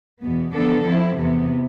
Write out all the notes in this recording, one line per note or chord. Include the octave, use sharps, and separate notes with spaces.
E2 B2 B3
D3 F3 B3 D4 A4
F3 C4 E4
E2 C3 E3 B3